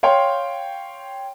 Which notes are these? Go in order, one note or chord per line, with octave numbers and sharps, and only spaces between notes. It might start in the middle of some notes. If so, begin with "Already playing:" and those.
C#5 F5 G5 C6